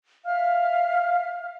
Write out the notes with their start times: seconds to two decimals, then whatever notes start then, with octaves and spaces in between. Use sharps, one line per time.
0.25 E5 F5 F6